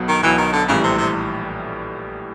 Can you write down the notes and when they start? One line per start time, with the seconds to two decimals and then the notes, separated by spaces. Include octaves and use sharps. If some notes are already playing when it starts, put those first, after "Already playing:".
Already playing: B1 B2 F#3
0.08 D#3
0.23 B1 B2 E3 F#3
0.38 D#3
0.53 D3
0.68 A#1 A2 C#3 E3 G3
0.84 C3
0.98 C3